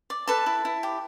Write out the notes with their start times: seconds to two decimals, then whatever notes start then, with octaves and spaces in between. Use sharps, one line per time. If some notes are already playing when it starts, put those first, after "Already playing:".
0.10 D5
0.28 A4 B4 A5
0.46 E4
0.65 E4
0.83 G4